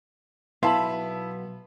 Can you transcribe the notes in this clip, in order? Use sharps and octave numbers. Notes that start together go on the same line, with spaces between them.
B1 B3 E4 F5 A5 B5 C6